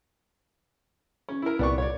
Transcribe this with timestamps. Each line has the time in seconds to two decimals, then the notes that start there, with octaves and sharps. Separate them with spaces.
1.29 C#4
1.42 E4 A#4
1.59 C2 A#2 B3 D5 C#6
1.78 C#5 D5